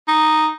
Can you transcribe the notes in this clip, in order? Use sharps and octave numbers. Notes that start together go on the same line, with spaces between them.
D#4